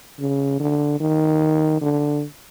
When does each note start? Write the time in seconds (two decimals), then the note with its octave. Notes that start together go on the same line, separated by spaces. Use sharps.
0.19 C#3
0.60 D3
1.00 D#3
1.81 D3